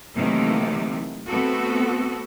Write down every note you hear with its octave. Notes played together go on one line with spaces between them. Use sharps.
C3 D#3 E3 F#3 A3 A#3
A3 B3 C4 F#4 A4